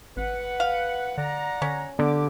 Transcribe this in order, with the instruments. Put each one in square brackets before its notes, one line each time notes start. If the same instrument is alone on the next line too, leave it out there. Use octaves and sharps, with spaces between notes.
[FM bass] G#1 [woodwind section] B4 F#5
[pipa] F5
[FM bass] D3 [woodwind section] D5 F#5 A#5
[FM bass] D3 [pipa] C#4
[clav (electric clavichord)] D3 [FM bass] B3 [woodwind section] G4 D6